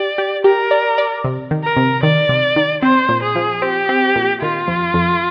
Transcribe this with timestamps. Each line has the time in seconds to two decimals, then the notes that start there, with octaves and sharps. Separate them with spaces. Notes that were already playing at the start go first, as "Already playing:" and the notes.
Already playing: G4 D5
0.18 G4
0.44 G4 A#4
0.71 D5
0.98 D5
1.24 C3
1.51 D#3
1.64 A#4
1.77 C3
2.03 D#3 D5
2.29 C3
2.56 D#3
2.82 C4 C5
3.09 A#2
3.23 G#4
3.35 F3
3.62 C4 G4
3.89 C4
4.16 A#2
4.42 D#3 F4
4.68 F2
4.94 F2